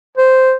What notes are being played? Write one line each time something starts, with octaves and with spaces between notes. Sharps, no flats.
C5